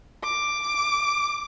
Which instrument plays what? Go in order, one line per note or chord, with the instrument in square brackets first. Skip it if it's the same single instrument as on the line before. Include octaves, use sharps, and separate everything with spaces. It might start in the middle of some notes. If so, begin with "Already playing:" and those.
[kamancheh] D6